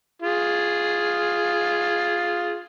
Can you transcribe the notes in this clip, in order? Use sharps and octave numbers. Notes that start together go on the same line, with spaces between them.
F4 G#4